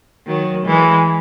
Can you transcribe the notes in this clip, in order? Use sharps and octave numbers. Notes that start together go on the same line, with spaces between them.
D#3 F#3
E3 G#3